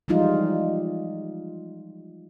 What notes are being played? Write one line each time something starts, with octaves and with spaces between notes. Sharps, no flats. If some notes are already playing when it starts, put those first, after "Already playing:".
E3 F3 G3 G#3 D#4 F4